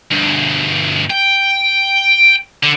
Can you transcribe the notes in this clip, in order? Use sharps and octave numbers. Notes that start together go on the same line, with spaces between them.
D2 G2
G5
D3